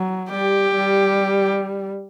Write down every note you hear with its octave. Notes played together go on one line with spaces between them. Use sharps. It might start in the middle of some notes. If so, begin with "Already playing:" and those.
Already playing: F#3
G3 G4
G3